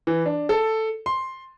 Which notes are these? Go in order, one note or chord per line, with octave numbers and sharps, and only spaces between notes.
E3
D4
A4
C6